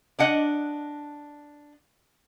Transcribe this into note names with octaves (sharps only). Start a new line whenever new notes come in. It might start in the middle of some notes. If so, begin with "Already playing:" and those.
D4 D#5 F#5